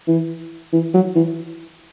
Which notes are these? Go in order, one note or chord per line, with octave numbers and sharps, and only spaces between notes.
E3
E3
F#3
E3